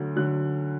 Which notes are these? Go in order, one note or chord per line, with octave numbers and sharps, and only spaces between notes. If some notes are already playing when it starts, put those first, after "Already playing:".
Already playing: D2 D3 F#3
D2 D3 F#3 F#6